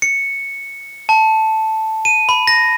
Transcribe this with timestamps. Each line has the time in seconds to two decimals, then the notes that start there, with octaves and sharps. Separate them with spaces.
0.02 C#7
1.09 A5
2.05 D#7
2.29 B5
2.47 A#6